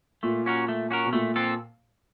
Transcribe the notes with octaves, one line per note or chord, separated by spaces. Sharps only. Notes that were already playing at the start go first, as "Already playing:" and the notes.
A#2 A3
C#4 F#4 A#4
A3
C#4 F#4 A#4
B2
A#2 A3
C4 A4